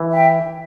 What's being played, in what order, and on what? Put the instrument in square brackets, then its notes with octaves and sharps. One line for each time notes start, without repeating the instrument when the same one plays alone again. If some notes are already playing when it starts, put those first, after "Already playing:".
Already playing: [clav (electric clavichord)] E3
[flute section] E5 G5